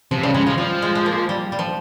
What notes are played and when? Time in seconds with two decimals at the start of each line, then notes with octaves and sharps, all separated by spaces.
0.11 C3 F3
0.23 C#3 G3
0.34 C#3 G#3
0.47 F3 G#3
0.58 F3 G3
0.82 G#3
0.95 G#3
1.06 A#3
1.29 G3
1.52 G3
1.59 F3